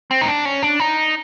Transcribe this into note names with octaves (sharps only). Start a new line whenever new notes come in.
C4
D#4
D4
C#4
D4
D#4